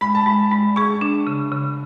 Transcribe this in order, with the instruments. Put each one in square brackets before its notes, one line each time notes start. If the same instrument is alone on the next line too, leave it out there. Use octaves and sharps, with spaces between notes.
[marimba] G#3 [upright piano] B5
[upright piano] A5
[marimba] G#3 [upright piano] B5
[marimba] G#3 [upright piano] B5
[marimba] G#4 [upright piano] C#6
[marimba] D4
C#3
C#3